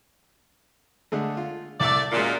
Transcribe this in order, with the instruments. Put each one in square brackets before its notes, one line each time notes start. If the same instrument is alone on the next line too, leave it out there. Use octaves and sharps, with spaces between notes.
[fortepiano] D3 G#3 A3
F4
[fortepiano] C2 E5 E6 [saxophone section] A3 D5
[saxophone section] F#2 A#2 [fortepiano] G#3 F4